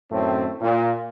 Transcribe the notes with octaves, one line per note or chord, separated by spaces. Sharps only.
F#2 A2 D#3 A3 C4
A#2